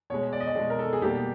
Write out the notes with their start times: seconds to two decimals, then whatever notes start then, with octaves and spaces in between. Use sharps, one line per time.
0.10 B2 G#3 C#5
0.33 D5
0.40 D#5
0.47 D5
0.55 B2 G#3 G#4
0.70 A#4
0.79 A4
0.93 G#4
1.02 B2 G3 A#3 G4